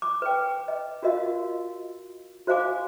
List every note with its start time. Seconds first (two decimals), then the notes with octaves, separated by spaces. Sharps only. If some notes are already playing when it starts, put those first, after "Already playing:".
0.02 D6
0.22 B4 G5
0.68 D#5
1.03 F4 F#4 A#4 D#5 F5
2.47 F#4 C5 D#5 F5 G#5 D6